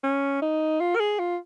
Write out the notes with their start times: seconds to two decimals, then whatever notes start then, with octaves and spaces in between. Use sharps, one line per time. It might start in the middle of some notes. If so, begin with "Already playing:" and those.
0.03 C#4
0.42 D#4
0.80 F4
0.96 A#4
1.00 G#4
1.19 F4